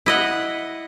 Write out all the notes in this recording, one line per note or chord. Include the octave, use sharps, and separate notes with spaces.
E4 D#5 F#5